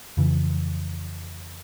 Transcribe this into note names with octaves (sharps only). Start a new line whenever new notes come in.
F2 C#3 E3